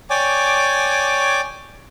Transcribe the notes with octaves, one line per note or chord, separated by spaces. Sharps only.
C#5 D5 G5 G#5 D6